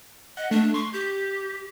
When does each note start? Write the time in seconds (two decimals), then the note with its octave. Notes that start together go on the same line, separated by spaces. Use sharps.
0.37 D#5 F#5
0.51 A3 D4
0.74 C6 C#6
0.93 G4 G6